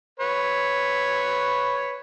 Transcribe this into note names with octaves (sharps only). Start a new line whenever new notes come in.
B4 C#5